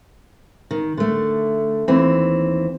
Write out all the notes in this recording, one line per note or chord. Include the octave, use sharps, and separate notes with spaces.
D#3
D3 A3
D#2 E3 C4